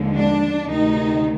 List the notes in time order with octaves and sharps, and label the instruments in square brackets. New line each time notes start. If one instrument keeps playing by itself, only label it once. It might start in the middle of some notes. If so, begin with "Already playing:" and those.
Already playing: [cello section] D#2 D3 F3 G#3
D4
D2 C3 D#3 D#4